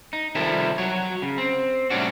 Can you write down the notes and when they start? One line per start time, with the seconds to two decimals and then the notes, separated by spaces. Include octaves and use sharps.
0.13 D#4
0.35 C3 D#3 F3 G3 E4 A4
0.78 F#3 C#5
1.22 C#3
1.38 C4
1.90 A2 C3 G3 C#4 D4 F#4